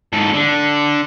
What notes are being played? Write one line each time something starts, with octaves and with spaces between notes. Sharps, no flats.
G#2 A4
D3